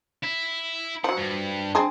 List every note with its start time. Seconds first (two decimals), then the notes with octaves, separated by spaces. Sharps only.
0.23 E4
1.04 F3 F#3 F#5
1.17 G2
1.75 C4 D4 G#4